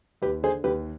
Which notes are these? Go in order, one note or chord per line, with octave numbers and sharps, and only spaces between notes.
D#2 G4 B4
D3 G#4 C5
D#2 G4 B4